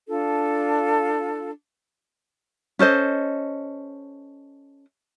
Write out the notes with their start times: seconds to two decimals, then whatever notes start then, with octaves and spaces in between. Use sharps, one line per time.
0.08 D4 F4 A4
2.79 C#4 A4 C5 D#5